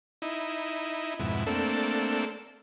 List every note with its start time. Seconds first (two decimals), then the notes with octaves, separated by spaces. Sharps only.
0.22 D#4 E4
1.19 F2 G#2 B2 E4
1.46 A3 A#3 C4 D4 A4